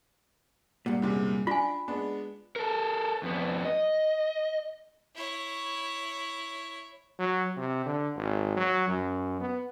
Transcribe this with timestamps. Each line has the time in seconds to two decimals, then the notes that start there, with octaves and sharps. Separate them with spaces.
0.86 G2 A#2 F#5
1.02 E2 C3 G#3
1.47 D4 F4 G#5 B5
1.88 G#3 B3 D4
2.56 A4 A#4
3.23 F2 B3
3.65 D#5
5.16 E4 C#5
7.19 F#3
7.57 C3
7.86 D3
8.16 G#1
8.57 F#3
8.88 F#2
9.40 B3